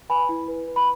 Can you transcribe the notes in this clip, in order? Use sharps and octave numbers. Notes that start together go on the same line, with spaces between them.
B4 G#5 B5
E4
B4
B4
B5